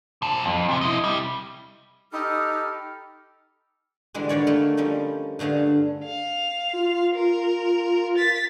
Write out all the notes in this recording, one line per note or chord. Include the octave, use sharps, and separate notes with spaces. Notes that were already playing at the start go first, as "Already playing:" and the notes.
A#2 A5
F2
F2 C3
E4 D#5
C2 G3
D#4 G4 A4 B5 E6 F6
D3 E3 G3 G#3 D4
D3 D#3 C#5 D5
A3 A#3
F3 G3 C#4 D#4
G2 D3 A3 G#4 F5
F5
F4
A#4
A6 B6